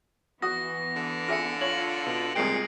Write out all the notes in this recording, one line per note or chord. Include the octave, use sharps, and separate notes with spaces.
E3 B3 F#4 D#6 A#6
D3
F4 G#4 E5 A#6 C#7
F4 C#5 F#7
B2
C2 A#2 G#3 G#4 G5 C7 D7